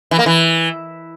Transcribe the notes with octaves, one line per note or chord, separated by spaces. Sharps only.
E3
A#3
E3